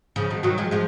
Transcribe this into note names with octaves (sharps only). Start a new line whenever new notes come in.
C#3 F3
B2 D#3
D#3 F#3
F3 G#3
F3 G#3